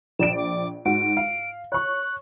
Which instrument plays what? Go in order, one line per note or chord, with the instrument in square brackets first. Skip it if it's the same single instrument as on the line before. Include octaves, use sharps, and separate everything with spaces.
[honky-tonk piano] A#1 D5 D7 [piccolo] E7
[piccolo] D6
[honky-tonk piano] G#2 F#4 [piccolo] D7
[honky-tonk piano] F5
[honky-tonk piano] C#5 C#6 [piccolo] F#6